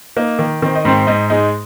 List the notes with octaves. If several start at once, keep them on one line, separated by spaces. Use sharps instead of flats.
A#3 D#4
D#3
D#3 C4
D#4
G#2 C4
G#2 D#4
G#3 D#4